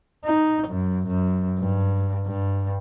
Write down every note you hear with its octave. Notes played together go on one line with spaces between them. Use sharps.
D#4
F#2
F#2
G2
G2